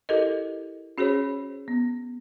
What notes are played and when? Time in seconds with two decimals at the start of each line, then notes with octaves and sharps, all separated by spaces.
0.09 E4 G4 A4 A#4 D#5
0.98 C#4 F#4 G#4 C5 C#5
1.68 B3